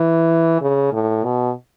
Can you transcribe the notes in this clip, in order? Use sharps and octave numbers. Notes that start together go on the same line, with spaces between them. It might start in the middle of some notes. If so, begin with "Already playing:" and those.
Already playing: E3
C#3
A2
B2